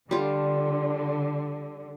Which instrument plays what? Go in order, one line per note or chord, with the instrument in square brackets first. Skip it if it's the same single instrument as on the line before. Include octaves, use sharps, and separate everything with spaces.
[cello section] D3 [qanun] G3 F4